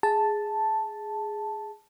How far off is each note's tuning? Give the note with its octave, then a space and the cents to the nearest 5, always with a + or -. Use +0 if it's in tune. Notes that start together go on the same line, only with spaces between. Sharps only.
G#4 +0 A5 +0